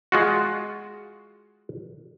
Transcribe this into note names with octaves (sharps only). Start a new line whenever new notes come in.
G#3 F4 F#4